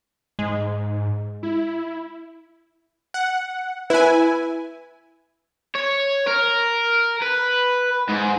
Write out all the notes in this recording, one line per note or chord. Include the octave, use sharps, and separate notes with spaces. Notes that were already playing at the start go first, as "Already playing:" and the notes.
G#2 G#3
E4
F#5
E4 B4 G#5
C#5
A#4
B4
G#2